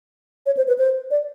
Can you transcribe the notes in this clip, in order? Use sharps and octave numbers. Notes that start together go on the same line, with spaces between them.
C#5
C5
B4
C5
D5